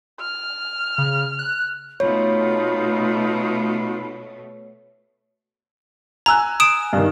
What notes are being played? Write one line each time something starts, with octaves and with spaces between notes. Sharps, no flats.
F6
C#3
F#6
B2 A3 D#4 F4 C#5 B5
G#5 A#5 E6 F#6
D#6 D7 E7
G2 D#3